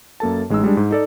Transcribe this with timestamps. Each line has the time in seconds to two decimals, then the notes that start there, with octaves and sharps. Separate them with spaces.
0.20 F#2 A#3 A4 A5
0.50 A1 G#3 D#4 E6
0.64 G3 G#3 D4
0.77 G#2
0.91 D#4 A4 D5